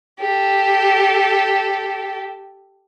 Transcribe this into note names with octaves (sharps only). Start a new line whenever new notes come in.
G4 A4